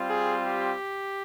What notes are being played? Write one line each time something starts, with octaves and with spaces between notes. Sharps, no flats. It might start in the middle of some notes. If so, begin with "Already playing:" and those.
Already playing: G3 C4 F4
G#4
G4